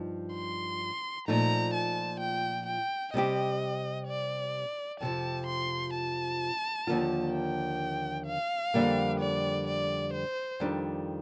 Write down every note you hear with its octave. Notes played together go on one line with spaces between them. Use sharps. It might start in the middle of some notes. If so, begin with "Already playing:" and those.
Already playing: G2 F3 D#4
C6
A#2 F3 A3 D#4 A#5
A5
G5
G5
C3 G3 C4 G4 D#5
D5
F2 C3 F3 A5
C6
A5
D#2 D3 F3 A#3 F4
G5
F5
F2 D3 G3 A#3
D5
D5
C5
F2 D#3 G3 D4